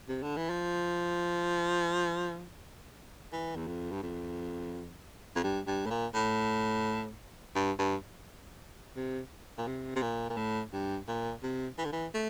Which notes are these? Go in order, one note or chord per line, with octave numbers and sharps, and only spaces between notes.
C3
D3
E3
F3
E3
E2
F2
G2
F2
F2
G2
G2
A2
A#2
A2
G2
G2
C3
A#2
C3
C3
A#2
A#2
A2
G2
A#2
C3
E3
D3
E3
A3